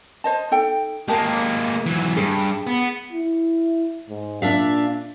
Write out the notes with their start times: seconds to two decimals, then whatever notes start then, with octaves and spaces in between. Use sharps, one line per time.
0.24 C5 D#5 A5
0.51 D#4 A4 G5
1.08 G#3 A#3 G4 A#4 A5
1.86 E3 F#3
2.16 G2 G#4
2.67 B3
3.12 E4
4.09 G#2
4.42 A#2 D4 E5 F5